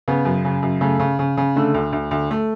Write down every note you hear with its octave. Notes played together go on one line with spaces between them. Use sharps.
C#3 B3
F#2
C#3
F#2
C#3 A3
C#3
C#3
C#3
D3 A3
D2
D2
D2
A3